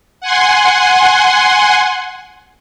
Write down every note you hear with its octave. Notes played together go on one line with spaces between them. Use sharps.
F#5 G#5 C6